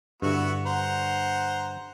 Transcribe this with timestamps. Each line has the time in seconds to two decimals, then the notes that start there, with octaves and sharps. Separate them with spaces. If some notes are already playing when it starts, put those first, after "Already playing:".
0.22 G2 D3 B3 E4 F#4
0.66 C5 F#5 A#5